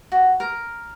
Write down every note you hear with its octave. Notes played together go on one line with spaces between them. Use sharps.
F#4
A#4